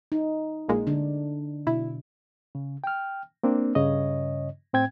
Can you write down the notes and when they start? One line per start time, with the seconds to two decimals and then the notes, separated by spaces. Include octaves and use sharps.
0.12 D#4
0.69 A#1 A#2 G#3
0.87 D3 D4
1.67 B2 E4
2.55 C#3
2.84 G5 F6
3.43 A#3 C4 D4
3.75 G2 C#3 C#5 D#5
4.73 A2 C4 G5 G#6